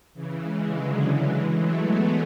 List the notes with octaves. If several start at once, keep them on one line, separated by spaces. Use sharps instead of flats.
C#3 E3
E3 G#3
D3 F#3
E3 G#3
F#3 A3
G#3 B3